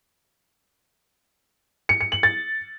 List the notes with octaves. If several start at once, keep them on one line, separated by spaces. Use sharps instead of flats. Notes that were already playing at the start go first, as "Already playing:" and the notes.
C#7
C#7
F#7
A6